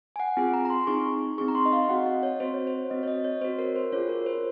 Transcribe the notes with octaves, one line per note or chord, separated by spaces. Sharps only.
G#5
F#5
C4 F4 G#4 G#5
A#5
A#5
C6
C4 D#4 G#4 C#6
C4 D#4 G#4 C#6
A#5
C6
D#5
F5
C4 F#4 F#5
D#5
C#5
C4 F#4 C5
C#5
C5
C4 F#4 D#5
C#5
D#5
C#5
C4 F#4 C5
A#4
C5
C#4 F4 G#4 C#5
A#4
C5